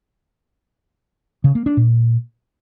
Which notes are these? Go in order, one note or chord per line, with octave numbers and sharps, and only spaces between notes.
C#3
A#3
D4
A#2